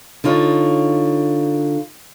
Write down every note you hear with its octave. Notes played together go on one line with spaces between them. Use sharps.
D3 D#4 F4 C#5